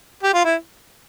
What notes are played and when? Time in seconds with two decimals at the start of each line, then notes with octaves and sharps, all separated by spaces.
0.23 G4
0.34 F4
0.44 E4